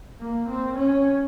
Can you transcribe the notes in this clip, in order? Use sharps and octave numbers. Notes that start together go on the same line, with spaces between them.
A#3
C4
C#4